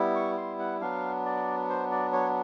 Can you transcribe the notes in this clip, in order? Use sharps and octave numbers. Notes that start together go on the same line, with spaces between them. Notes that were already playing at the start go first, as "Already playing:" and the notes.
Already playing: G3 B3 E4
C#6
C6
F#5
F#3 B3 D4 F5
D5
C5
D5
C#5